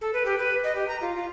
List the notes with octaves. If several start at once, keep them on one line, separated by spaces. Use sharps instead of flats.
A4
B4
G4
B4
D#5
G4
A#5
F4
F4